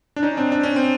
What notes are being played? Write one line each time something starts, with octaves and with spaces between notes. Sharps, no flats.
D4
C#4 D#4
C4 D4
D4
C#4
C4